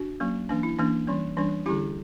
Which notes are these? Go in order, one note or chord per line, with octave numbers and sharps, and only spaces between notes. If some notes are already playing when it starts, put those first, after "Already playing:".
Already playing: D4 F#4
F#3 A#3 C#4
E3 A#3 C#4 D4
E4
E3 A#3 C#4 D4
E3 G3 C#4
E3 G3 C#4 D4
D3 G3 C#4 E4 G4